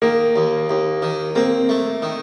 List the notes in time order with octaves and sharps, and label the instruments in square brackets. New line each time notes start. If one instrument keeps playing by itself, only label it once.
[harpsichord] D#3 [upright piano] A#3
[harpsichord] D#2
D#2
D#3
[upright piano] A#3 [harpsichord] C4
[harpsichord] A3
D#3